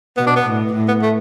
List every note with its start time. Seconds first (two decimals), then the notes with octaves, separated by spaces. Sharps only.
0.17 B2 B3
0.27 D4
0.36 B3
0.46 A2
0.73 A2
0.88 B3
1.02 A3